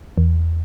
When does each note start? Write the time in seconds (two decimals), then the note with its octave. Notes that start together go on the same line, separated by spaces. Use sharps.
0.18 E2